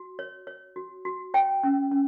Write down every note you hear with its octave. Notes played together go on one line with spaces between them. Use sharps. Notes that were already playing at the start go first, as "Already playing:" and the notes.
Already playing: F#4
C#5
C#5
F#4
F#4
C#5 G5
C#4
C#4